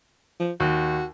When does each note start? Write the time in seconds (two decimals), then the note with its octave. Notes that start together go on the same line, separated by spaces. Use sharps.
0.40 F3
0.60 D#2 F#4